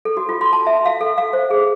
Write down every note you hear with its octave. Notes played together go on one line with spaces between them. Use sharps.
A4
F#4
F4
C6
A5
E5
F5
A4
F5
C5
G#4